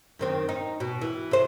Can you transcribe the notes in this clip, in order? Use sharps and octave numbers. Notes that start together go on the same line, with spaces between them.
F#2 D#3 C4
D#4
B2
E3
C3 C5